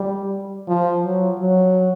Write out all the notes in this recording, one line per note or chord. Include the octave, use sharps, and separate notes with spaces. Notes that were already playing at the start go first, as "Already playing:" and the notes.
Already playing: G3
F3
F#3
F#3